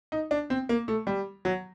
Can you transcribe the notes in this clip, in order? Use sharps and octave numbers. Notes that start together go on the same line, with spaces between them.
D#4
D4
C4
A#3
A3
G3
F#3